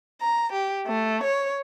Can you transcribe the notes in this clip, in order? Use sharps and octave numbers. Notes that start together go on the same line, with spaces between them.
A#5
G4
A3
C#5